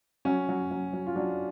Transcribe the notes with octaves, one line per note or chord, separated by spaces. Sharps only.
F#3 C#4
F#3
F#3
F#3
F4
F#3 D4